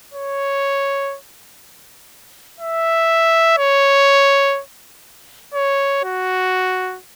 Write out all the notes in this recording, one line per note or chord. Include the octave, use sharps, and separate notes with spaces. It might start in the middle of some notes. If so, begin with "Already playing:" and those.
C#5
E5
C#5
C#5
F#4